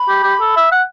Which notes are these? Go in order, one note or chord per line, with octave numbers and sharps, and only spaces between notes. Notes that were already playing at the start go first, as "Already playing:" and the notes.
Already playing: B5
G4
G4
A4
E5
F#5